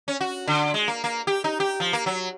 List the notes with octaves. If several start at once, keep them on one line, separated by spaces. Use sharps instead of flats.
C#4
F#4
D3
G#3
A#3
A#3
G4
D#4
G4
F3
A#3
F#3